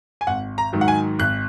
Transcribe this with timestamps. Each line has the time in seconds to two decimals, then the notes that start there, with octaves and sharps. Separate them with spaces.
0.21 G#5
0.27 G#1 F#5
0.58 A#5
0.73 G#2 D#3 F#3
0.81 F#5
0.88 G#5
1.19 G#1 F#6